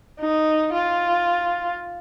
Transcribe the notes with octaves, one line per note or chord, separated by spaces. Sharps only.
D#4
F4